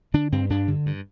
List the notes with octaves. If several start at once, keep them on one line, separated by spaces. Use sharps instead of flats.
D3 D4
G2 C4
G2 D4
D3
G2